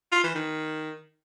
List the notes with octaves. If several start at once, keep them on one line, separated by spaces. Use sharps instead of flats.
F4
E3
D#3